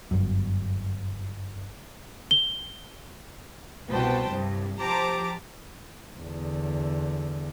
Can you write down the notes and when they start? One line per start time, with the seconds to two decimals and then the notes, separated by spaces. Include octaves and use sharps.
0.11 G1 F#2
2.31 G7
3.90 C2 B2 B4 C5 G5 A5
4.30 C2 G2
4.79 F3 G4 C5 A5 A#5 D6
6.19 E2 D3